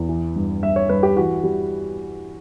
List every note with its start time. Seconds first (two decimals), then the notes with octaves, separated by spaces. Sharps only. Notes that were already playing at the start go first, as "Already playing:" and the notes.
Already playing: E2
0.09 E3
0.36 G2
0.63 G2 E5
0.76 C#5
0.89 G2 B4
1.03 G4
1.17 E3 F#4
1.43 G3